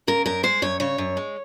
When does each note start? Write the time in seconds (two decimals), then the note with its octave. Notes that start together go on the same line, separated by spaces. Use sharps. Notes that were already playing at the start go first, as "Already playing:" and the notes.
0.07 C#3 A#4
0.26 F#2 A#4
0.43 G#3 C5
0.62 F#2 C#5
0.80 C#3 C#5
0.98 F#2
1.17 G#3